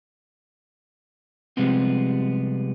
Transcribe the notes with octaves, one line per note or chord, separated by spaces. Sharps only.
C3 F3 G3 G#3 B3 C4